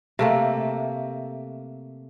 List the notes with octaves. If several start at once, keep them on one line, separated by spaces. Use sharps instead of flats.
C3 A3 A#3